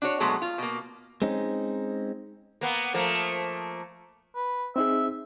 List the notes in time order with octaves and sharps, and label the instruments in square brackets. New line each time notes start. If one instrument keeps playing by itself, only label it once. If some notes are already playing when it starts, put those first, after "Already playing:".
[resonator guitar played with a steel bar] D4 F#4 C#5
B2 F#3 G#3 A3 B3
F4
B2 A#3
[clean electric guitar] G#3 C4 C#4 D#4
[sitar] A#3 B3
F3 A3 A#3
[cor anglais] B4
[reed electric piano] C4 D#4 G#4 [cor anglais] E5